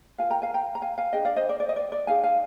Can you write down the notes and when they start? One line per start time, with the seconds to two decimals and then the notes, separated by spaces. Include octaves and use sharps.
0.18 F4 A#4 F5 G#5
0.30 G5 A#5
0.42 F5 G#5
0.54 G5 A#5
0.75 A#5
0.82 F5 G#5
0.98 F5 G#5
1.13 D4 G#4 D#5 G5
1.25 D5 F5
1.36 C5 D#5
1.49 D5
1.60 D5
1.69 D#5
1.76 D5
1.92 D5
2.07 D#4 G#4 F5 G#5
2.24 F5 G#5